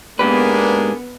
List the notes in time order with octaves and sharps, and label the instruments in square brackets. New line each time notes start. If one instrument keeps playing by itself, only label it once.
[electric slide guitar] G#2 G4 B4 [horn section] A#3 D4 G#4 [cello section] B3